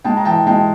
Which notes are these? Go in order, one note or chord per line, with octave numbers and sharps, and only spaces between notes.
G#3 G5 A5
A#5
E3 G5 A5
G#3 G5 A5